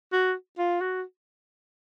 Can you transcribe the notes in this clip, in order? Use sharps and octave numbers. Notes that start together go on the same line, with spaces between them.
F#4
F4
F#4